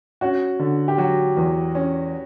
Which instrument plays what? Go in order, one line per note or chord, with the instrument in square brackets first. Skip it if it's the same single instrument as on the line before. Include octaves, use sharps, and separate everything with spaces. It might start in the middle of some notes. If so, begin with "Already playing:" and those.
[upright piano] C#4 [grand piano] F#4
[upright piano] D3
[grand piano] G4
[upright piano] F#3 [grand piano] F#4
[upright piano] E2
C#4